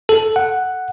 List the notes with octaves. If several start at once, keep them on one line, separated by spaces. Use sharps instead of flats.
A4
F#5